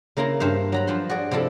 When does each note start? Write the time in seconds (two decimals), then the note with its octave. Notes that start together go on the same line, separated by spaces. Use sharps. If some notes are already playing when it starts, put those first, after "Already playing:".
0.17 C#3 A#3 E4 A#5 C6
0.40 G2 C5 E5 F5
0.72 F#3 A#5 B5
0.87 G2 F3 C5 B5 C6
1.09 F#4 G#4 D5
1.31 C3 F3 E4 A4